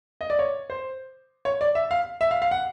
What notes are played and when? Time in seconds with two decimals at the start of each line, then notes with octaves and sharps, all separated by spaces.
0.21 D#5
0.30 D5
0.39 C#5
0.70 C5
1.45 C#5
1.61 D5
1.75 E5
1.91 F5
2.21 E5
2.31 F5
2.42 F5
2.51 F#5